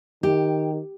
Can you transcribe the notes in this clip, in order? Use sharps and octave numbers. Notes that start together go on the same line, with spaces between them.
D#3 G4